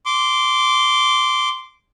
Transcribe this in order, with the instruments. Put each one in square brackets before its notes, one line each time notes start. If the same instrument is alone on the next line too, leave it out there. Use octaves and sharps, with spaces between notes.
[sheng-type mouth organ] C6 D6